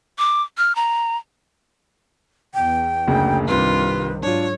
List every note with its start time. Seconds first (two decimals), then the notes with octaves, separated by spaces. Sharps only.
0.19 D6
0.58 F6
0.76 A#5
2.55 E2 G5
3.07 F#1 D2 C#3
3.48 C2 G2 C3 D#3 F4 B4
4.23 G#2 F#3 D4 F4 C#5